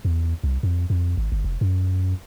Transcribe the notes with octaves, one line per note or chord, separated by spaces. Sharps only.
E2
C2
F2
F2
G#1
G1
F1
F#2